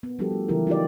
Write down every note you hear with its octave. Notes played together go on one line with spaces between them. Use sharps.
B3
F3 G3 D4 F#4 G4 A4
A3
C#3 E3 F#3 E4 G4 A#4
D#4 F4 G4 D5